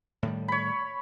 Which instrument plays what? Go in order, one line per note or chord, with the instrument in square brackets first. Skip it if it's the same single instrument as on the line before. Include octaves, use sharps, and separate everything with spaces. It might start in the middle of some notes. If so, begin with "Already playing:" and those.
[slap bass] A2 D#3 G3
[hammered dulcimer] C#5 B5